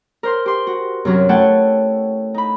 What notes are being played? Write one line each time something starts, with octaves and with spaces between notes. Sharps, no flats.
A#4 C5 C6
G4 C6
F#4
F#2 C3 F#3 A#4
A3 E4 C#5 F#5 G5 A5
D#4 B5